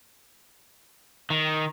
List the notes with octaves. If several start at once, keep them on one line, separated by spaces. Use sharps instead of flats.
D#3